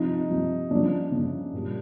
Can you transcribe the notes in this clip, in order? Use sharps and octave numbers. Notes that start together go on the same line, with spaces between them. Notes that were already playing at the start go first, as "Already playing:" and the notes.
Already playing: C3 F3 D#4
C3 F3
C#3 F3 D4
C#3 F3
A#2 G3